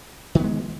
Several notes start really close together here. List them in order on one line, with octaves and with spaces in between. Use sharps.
D#3 B3 G#3